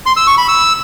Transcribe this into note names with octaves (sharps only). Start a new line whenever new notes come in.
C6
E6
C#6
B5
E6